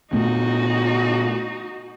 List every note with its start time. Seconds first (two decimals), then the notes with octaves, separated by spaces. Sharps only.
0.13 A#2 A3 B3 D#4 F#4